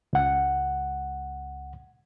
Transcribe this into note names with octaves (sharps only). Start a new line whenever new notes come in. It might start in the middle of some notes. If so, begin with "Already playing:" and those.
C#2 F#5